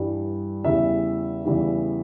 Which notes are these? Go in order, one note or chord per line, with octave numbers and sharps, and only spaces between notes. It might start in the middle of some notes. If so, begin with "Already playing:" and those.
Already playing: G2 E3 G3
E2 C#3 E3 G3 E5
E2 C#3 E3 G3